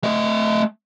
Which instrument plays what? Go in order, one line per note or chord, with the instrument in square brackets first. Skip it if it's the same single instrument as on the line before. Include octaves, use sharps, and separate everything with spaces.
[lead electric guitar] A3 D#5